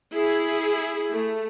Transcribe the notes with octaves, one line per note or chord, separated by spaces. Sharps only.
E4 G#4
A3